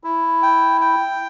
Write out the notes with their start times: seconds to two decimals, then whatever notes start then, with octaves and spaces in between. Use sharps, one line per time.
0.04 E4
0.43 G5
0.81 G5